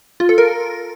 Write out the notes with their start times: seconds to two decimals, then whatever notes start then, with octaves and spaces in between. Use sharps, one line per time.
0.20 F4
0.29 A4
0.38 A#4